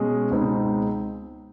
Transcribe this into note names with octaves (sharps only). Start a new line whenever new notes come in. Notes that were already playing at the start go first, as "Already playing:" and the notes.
Already playing: B2 G#3 C#4
C#2 B2 G#3 C4 D#4